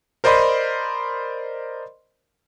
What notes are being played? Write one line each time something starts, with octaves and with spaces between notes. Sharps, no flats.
A#4 C5 D5 D#5 B5 C6